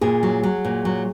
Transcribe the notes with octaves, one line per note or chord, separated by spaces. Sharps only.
A#2 G#4
F#3
F#3
A#2
F#3